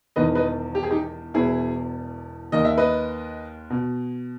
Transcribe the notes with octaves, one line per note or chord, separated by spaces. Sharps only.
E1 E2 D#3 B4 D#5
B4 D#5
G4
G#4
D#4 G4
E1 E2 B2 E4 G#4
D#2 D#3 D#5
E5
B4 D#5
B2